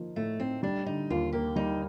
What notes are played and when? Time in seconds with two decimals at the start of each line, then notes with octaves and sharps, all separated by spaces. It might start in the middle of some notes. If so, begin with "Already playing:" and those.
Already playing: F3 A#3 D#4
0.16 A2 A3
0.39 C4 D#4
0.63 G3 D4
0.86 D3 D#4
1.10 D#2 F4
1.33 A#3 G4
1.56 G3 D#4